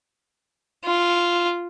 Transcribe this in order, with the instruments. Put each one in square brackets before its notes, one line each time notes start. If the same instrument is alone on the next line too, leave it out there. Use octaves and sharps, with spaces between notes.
[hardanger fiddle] F4